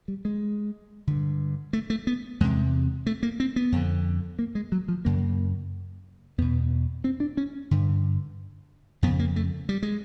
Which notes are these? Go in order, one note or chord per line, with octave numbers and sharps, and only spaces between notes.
G3
G#3
G2 D3
A3
A3
B3
E2 C3 G#3
A3
A#3
C4
B3
F2 D3
A#3
G#3
F#3
F3
F#2 C#3 A#3
E2 B2 B3
C4
D4
C#4
G2 D3
F2 C#3 B3
A#3
A3
G3
G#3